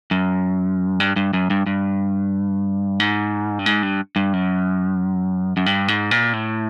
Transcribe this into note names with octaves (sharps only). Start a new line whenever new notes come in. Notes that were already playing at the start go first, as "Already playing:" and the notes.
F#2
G2
G2
F#2
G2
G2
G#2
G2
G#2
G2
G2
F#2
F#2
G2
G#2
A#2
A2